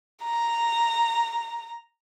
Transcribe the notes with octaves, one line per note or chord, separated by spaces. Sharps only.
A#5